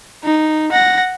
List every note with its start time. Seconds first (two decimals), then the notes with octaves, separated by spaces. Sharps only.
0.23 D#4
0.72 F#5 A#6